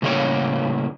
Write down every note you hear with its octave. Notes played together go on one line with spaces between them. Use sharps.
A2 C#3 G3 A#3 G4 C#5